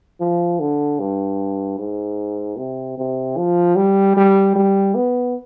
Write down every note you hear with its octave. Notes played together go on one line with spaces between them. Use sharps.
F3
D3
G2
G#2
C3
C3
F3
G3
G3
G3
B3